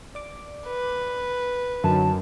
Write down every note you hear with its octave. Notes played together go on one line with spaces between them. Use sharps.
D5 D6
B4
F#2 D3 F#3 D#4 A5